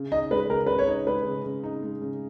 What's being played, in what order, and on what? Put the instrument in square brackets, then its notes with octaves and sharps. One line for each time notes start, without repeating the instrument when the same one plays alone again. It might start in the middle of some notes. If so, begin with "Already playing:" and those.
Already playing: [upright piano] C#3
[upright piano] D#4 [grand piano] D#5
[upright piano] G#3 [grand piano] B4
[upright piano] C#3 [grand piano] A#4
[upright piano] C#3 [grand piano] B4
[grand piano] C#5
[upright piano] D#4
[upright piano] G#3 [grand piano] B4
[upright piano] C#3
C#3
D#4
G#3
C#3